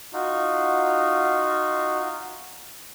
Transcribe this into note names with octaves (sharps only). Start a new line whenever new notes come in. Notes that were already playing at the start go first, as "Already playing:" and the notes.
D#4 F4 F#4